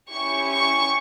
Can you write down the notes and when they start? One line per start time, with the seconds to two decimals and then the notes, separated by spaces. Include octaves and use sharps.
0.11 C#4 E4 G4 C#6
0.51 C#6